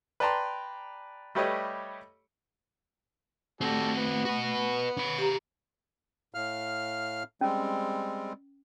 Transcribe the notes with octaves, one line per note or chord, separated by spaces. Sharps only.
B4 D5 G5 A5 A#5 C6
G3 A3 G4 B4 C#5 D#5
G3 A3 C4 F#4 A4
B3
F#4 B4
C#4 B5
G4 A#5
A2 F5 F6
G3 G#3 C4 C#4